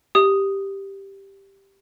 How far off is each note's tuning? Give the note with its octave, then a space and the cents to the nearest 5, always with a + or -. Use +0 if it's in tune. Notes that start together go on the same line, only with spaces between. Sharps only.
G4 +0 D#6 +0